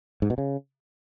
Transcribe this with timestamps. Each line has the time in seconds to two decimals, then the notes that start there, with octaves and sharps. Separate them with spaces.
0.22 G#2
0.30 B2
0.38 C#3